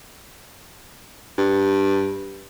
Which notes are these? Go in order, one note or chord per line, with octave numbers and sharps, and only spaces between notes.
G2